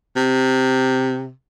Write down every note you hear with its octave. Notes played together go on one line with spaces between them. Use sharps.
C3